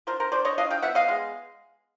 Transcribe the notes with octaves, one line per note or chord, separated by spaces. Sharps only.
D4 A#4 C5
A#4 C5
D4 C5 D5
C#5 D#5
D4 D#5 F5
F5 G5
B3 E5 F#5
D#5 F5
G#3